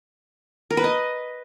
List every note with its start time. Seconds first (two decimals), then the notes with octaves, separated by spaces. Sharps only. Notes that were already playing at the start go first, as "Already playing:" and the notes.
0.71 A#4
0.77 B4
0.84 D#5